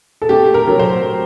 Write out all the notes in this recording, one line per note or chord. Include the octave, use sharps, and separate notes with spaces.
A4
A3 G4
A#4
F#3
C5